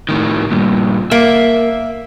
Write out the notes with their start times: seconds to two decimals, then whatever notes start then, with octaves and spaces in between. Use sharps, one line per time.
0.09 A2 D#3
0.52 G2 A#2
1.11 A#3 E5